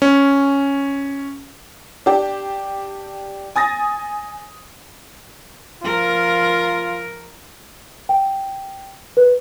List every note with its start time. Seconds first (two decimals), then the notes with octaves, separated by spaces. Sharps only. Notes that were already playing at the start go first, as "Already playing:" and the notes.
0.02 C#4
2.06 D4 G4
3.56 G#5 D#6 A6 A#6
5.83 F3 F4 A#4
8.09 G5
9.17 B4